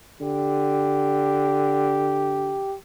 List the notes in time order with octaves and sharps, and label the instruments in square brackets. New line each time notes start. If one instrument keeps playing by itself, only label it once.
[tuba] D3 [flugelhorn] G4